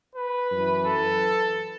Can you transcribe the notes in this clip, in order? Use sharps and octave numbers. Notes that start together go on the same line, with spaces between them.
B4
F#2 E3
A4